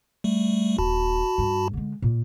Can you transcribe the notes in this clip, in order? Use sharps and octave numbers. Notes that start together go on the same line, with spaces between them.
G3 A3
D#1 F#4 A5 B5
G2
D3 G#3
A#2